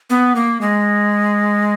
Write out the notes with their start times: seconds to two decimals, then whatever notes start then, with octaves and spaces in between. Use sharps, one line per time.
0.10 B3
0.35 A#3
0.61 G#3